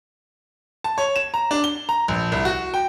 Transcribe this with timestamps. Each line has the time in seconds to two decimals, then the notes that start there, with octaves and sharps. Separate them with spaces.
0.84 A5
0.98 C#5
1.16 E7
1.34 A#5
1.51 D4
1.64 G7
1.89 A#5
2.08 A#1
2.32 C2
2.45 F#4
2.74 G5